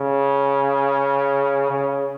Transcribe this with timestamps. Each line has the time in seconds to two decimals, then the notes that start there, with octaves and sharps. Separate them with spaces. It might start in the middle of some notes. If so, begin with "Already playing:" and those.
Already playing: C#3
1.71 C#3